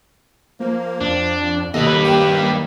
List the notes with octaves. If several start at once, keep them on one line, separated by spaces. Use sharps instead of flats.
F3 A#3
F2 D4
D#2 A#3 A4 B4 D#5
G3 B4
A#3 G4